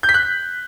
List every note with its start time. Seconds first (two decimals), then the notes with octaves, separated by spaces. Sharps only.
0.03 G6
0.09 B6
0.14 F#6